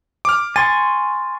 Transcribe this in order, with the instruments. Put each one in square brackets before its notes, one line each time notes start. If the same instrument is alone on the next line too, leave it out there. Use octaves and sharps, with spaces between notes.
[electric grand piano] D6 F6
[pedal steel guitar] G#5 C6 C#6 [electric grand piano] A6